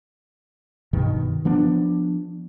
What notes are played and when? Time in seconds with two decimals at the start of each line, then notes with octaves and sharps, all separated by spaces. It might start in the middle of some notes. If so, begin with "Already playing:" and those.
0.93 G2 B2 D#3
1.45 F3 B3 D4